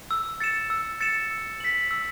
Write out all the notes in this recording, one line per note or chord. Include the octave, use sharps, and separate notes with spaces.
E6
A6 C#7 E7
E6
A6 C#7 E7
E6
B6 F#7
E6